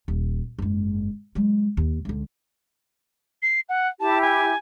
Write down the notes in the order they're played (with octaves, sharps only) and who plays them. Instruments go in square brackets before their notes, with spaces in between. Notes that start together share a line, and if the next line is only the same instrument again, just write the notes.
[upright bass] D#1
F#1 G#2
F#3 G#3
D#2
C#2 D3
[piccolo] C7
F#5
[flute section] E4 G4 [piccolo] A5
[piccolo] G#5